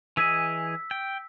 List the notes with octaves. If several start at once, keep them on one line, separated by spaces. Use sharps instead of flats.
E3 G#4 D#5 E6 B6
G5